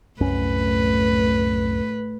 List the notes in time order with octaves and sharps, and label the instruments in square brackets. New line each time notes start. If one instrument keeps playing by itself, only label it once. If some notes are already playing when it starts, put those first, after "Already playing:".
[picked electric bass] C2 F#2 C#4 [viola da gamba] A2 B4